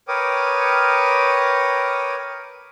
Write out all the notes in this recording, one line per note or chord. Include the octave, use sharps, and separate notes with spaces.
A#4 B4 C#5 G5 D6 D#6